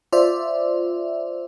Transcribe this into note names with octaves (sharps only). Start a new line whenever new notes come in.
F4 C5 D5 E5